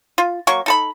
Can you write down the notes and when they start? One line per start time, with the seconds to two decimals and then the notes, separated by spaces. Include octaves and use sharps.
0.18 F4
0.47 F#3 A#3 C#6
0.66 D#4 A4 B5